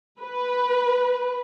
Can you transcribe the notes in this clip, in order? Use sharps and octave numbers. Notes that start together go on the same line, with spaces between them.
B4